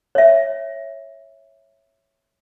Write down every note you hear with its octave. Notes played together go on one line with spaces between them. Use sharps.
C#5 E5